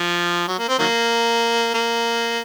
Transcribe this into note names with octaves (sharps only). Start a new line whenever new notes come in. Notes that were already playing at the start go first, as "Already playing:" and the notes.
Already playing: F3
F#3
A#3
C4
D#3 F#3 A#3
A#3